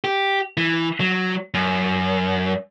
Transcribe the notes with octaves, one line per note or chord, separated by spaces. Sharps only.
G4
E3
F#3
F#2